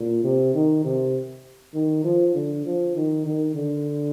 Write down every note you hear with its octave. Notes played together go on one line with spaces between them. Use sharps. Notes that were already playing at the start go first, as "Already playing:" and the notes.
Already playing: A#2
C3
D#3
C3
D#3
F3
D3
F3
D#3
D#3
D3